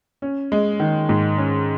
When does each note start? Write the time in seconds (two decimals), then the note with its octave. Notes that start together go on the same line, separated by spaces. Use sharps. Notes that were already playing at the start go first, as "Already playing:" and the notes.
0.22 C#4
0.52 G#3
0.80 D#3
1.09 G#2
1.38 C#4